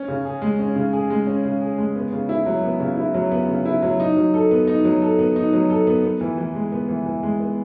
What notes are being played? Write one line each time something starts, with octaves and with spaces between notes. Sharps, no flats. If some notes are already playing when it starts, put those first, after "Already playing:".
Already playing: C#4
C#3
G#4
G#3
C#4
C#3
G#4
G#3
C#4
C#3
G#4
G#3
B3
C#3
E4
F#3
B3
C#3
E4
F#3
B3
C#3
E4
F#3
D#4
F#3
A4
B3
D#4
F#3
A4
B3
D#4
F#3
A4
B3
B3
E3
E3
G#3
B3
E3
E3
G#3
B3